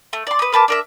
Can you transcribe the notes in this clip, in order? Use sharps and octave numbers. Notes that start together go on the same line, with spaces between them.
A3
D5 C6
B4 D#6
A#4 B4 A5 D6
D4 A#4 E5